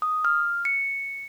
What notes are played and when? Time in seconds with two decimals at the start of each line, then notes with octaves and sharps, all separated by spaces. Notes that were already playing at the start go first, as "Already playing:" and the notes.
0.02 D#6
0.25 F6
0.65 C#7